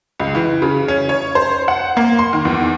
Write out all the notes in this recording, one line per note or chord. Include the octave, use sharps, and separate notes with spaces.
C#2
E3
C#3
C#4
C#5
C5
F#5
A#3
C6
D#3
E2